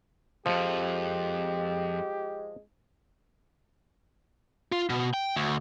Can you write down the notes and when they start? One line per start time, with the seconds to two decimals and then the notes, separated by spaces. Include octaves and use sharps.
0.46 C2 F2 F3 G#3 G4
4.72 F4
4.90 B2
5.14 G5
5.36 D2